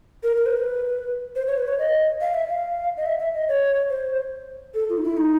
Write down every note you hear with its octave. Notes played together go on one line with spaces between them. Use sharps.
A#4
A#4
C5
B4
C5
C#5
B4
C#5
D#5
F5
E5
F5
D#5
E5
E5
D#5
C#5
C5
A4
F4
D#4
E4
D#4